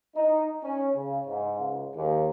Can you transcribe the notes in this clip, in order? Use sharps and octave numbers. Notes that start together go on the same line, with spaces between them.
D#4
C#4
C#3
G#2
C#2
D#2